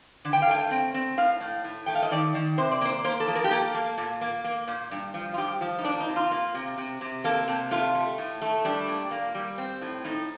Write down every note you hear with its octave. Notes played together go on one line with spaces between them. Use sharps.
D3
G5
F5
A3 G5
C4
C4
A2 F5
A2
A2
A3 G5
F5
D#5
D#3 D5
D#3
C3 C5
D5
A#3 C5
A#3 C5
A4
F3
A#4
G4
A#3 A4
A#3
A#2
A#3
A#3
A#2
G2
F3
F4
G2 G4
F3
D#4
A#3 D4
D#4
C3
F4
A#3
C3
C3
C3
A#3 A4
C3
A3 F4
A3
A2
A3
G3 D4
A#2
A#3
G3
C4
A2
A2 D#4